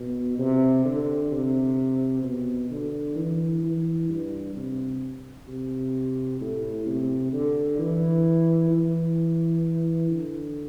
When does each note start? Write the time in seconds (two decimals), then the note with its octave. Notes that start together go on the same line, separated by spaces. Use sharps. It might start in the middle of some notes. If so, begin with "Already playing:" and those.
Already playing: B2
0.39 C3
0.85 D3
1.32 C3
2.23 B2
2.70 D3
3.16 E3
3.62 E3
4.09 G2
4.55 C3
5.48 C3
6.41 A2
6.86 C3
7.33 D3
7.79 E3
8.71 E3
10.10 D3